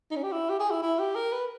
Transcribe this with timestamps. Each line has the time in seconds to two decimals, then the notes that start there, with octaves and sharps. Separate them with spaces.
0.11 D#4
0.16 C#4
0.23 G4
0.32 E4
0.49 G4
0.59 G#4
0.70 E4
0.82 E4
0.99 G4
1.15 A#4
1.32 B4